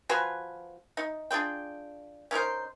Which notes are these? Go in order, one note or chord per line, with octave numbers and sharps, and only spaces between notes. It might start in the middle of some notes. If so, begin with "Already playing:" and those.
F3 F#4 B4 G#5
D#4
D4 F4 G#4 G5
C#4 D#4 A#4 C5